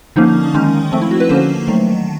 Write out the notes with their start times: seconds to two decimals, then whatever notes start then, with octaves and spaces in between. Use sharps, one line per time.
0.16 D3 F3 A#3 C#4 D#4
0.54 D#3 G#3 C#4 D#4
0.92 F3 A3 C4
1.02 E4
1.11 F#4
1.20 B4
1.29 D3 F3 A#3 C#4 C5
1.68 D#3 F#3 A3